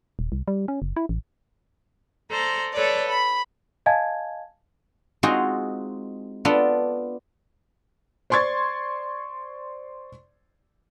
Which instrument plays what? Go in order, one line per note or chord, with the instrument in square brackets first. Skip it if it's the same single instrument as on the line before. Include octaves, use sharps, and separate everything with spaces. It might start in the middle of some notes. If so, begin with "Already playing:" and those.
[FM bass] D#1
C2
G3
C#4
F#1
E4
A1
[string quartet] A4 C5 D5 A#5
A4 B4 C#5 D5
B5
[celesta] D#5 F5 G#5 A5 G#6
[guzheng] G#3 C4 D#4 F4 F#4 G#4
B3 D4 F4 A4 B4
[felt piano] C5 D5 C6 C#6 G#6 A6